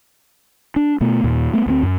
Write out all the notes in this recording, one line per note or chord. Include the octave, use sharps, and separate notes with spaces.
D4
B2 A3 B3
D#2 A#2
A3 B3
D2 G#3 C4
F#2